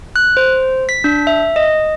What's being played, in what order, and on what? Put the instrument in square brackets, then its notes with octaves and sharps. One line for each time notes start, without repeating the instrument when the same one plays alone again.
[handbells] F#6
C5
B6
D4
E5
D#5